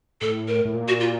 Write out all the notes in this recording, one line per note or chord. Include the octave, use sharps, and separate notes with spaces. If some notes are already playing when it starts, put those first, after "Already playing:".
A2 A4
A#4
A2
A#2
F#4
F4